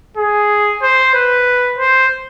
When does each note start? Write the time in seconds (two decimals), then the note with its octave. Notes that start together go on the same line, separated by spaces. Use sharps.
0.17 G#4
0.82 C5
1.14 B4
1.78 C5